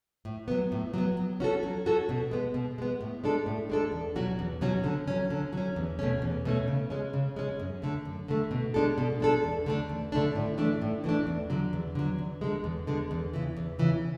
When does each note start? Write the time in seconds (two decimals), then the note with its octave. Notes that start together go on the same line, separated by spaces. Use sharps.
0.25 A2
0.48 F#3 B3
0.72 A2
0.94 F#3 B3
1.17 F#3
1.40 C#4 F#4 A4
1.63 F#3
1.86 C#4 F#4 A4
2.09 B2
2.31 G#3 B3
2.54 B2
2.78 G#3 B3
3.01 A2
3.24 G#3 D4 A4
3.46 A2
3.69 G#3 D4 A4
3.92 E2
4.16 B2 F#3 C#4 F#4
4.39 E2
4.61 B2 F#3 C#4 F#4
4.84 D3
5.08 F#3 C#4
5.30 D3
5.53 F#3 C#4
5.76 E2
5.99 B2 A3 C#4
6.22 E2
6.45 B2 A3 C#4
6.68 C#3
6.90 G#3 C#4
7.13 C#3
7.36 G#3 C#4
7.60 F#2
7.82 D3 A3
8.05 F#2
8.28 D3 A3
8.51 B2
8.74 G#3 D4 A4
8.98 B2
9.20 G#3 D4 A4
9.44 E2
9.66 D3 A3 D4
9.89 E2
10.12 D3 A3 D4
10.35 A2
10.58 E3 A3 D4
10.82 A2
11.04 E3 A3 D4
11.27 E2
11.50 D3 F#3
11.73 E2
11.95 D3 F#3
12.19 E2
12.41 D3 G#3
12.64 E2
12.87 D3 G#3
13.11 E2
13.34 C#3 E3
13.57 E2
13.79 C#3 E3